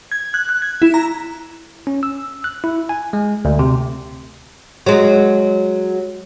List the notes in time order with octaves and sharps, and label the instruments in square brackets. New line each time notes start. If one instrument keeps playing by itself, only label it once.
[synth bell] G#6
F#6
F#6
G#6
E4
A#5
[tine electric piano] C#4
E6
F#6
E4
G#5
G#3
D2
C3
[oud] F#3 G#3